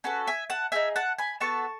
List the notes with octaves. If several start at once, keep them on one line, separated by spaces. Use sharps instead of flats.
C#4 F#4 A4 B4
E5 G#5
F#5 A5
D#4 G#4 E5 G#5
F#5 A5
G#5 B5
B3 F#4 A4 A5 C#6